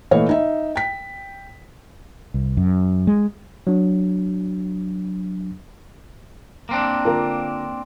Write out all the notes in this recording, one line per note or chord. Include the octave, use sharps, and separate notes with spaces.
A#2 E3 A3 C#5 D#5 F5
D#4 E5
G5 B6
C2
F#2
G#3
F#3 D4
A#3 C4 D4
D3 F4 A#4